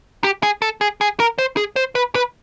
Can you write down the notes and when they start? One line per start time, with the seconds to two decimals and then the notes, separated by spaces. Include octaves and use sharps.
0.24 G4
0.43 G#4
0.62 A4
0.81 G#4
1.01 G#4
1.20 A#4
1.38 C5
1.57 G#4
1.76 C5
1.95 B4
2.15 B4